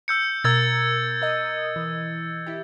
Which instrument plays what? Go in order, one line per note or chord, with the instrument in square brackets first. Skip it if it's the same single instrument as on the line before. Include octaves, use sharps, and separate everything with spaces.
[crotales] E6 G6 C#7
[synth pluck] B2 A#4 [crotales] E6 G#6 A6
[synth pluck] A#4 D#5 D#6
E3
E4 G4